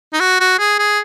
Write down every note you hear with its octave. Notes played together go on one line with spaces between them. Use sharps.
D#4
F#4
F#4
G#4
G#4